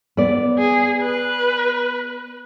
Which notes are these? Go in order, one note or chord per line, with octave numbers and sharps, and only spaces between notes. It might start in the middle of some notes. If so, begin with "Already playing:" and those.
B3 D5
G#4
B4